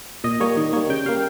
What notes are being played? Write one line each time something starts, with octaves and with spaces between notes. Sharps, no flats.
A#2 D#5
G3 A#3 C#5
D#3 D#5
G3 A#3 C#5
C#3 G5
G3 A#3 F5